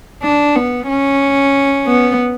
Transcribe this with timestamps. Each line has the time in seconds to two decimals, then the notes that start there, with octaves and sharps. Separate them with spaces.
0.23 D4
0.56 B3
0.89 C#4
1.87 B3